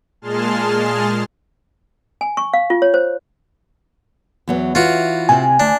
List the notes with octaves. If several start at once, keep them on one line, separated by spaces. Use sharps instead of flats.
A#2 G#3 G#4 A5 C6 F6
G#5
C#6
F5
F4
C#5
C5
E2 F#3 B3
E3 C#4 F4 F#4
C3 C4 G#5
D2 D4